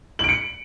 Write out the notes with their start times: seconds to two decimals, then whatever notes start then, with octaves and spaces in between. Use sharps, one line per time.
0.19 F#7
0.24 D7
0.29 C#7